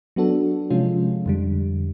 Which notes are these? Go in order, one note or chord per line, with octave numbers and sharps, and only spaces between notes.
F#3 B3 D4 F#4 A4
C3 F3 G#3 C#4 F4
F2 D3 G3